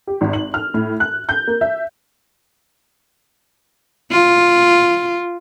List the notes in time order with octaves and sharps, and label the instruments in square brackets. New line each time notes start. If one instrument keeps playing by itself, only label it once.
[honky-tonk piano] G4
G#1
F#7
F6
A2
F#6
G6
A#3
E5
[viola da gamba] F4